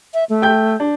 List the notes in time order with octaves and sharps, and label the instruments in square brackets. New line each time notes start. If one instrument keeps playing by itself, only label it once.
[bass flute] E5
A3
[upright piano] G5 G6
D4